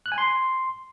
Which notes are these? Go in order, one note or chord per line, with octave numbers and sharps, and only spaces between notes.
F#6
G#5
C6